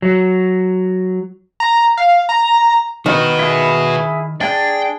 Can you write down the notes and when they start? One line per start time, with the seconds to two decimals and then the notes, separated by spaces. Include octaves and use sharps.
0.02 F#3
1.60 A#5
1.97 F5
2.29 A#5
3.06 D#3 F#4 B4
3.39 E4 G#4
4.41 D4 G#4 G5